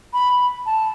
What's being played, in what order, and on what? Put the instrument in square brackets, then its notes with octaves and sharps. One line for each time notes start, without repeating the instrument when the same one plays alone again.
[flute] B5
A5